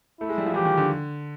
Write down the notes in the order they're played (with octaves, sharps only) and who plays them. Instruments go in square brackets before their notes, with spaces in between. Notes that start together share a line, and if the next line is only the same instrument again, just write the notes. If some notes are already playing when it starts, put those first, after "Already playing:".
[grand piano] A3 [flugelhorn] E4
[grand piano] G#3
G3
F3
[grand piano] E3 [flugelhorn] G4
[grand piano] D#3
D3